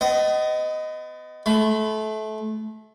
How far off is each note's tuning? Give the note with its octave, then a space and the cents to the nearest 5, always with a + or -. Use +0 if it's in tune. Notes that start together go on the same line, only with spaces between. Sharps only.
B3 +40 D#5 +0
A3 -25 B5 +35